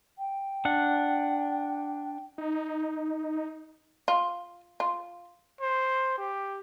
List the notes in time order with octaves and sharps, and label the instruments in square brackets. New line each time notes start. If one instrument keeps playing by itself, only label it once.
[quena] G5
[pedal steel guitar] D4 F#5
[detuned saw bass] D#4
[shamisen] F4
F4
[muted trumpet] C5
G4